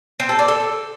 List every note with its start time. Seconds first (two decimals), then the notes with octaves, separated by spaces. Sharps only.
0.20 C4
0.29 A4
0.39 D5
0.48 A4